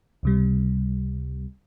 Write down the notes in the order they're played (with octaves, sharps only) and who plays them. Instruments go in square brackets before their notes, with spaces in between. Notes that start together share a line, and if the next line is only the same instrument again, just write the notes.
[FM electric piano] C#2 C3 G3